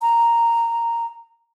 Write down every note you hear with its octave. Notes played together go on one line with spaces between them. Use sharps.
A#5